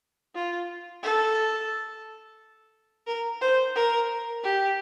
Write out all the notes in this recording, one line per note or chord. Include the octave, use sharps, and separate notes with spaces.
F4
A4
A#4
C5
A#4
G4